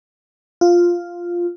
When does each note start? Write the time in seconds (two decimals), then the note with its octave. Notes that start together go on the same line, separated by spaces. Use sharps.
0.61 F4